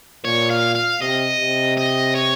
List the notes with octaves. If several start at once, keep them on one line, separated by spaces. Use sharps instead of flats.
A#2 C#5
F5
F5
C3 D#5
C3
D#5
C#5